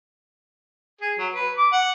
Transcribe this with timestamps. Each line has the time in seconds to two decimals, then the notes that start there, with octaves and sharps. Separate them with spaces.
1.01 G#4
1.18 F#3
1.34 B4
1.57 D6
1.73 F#5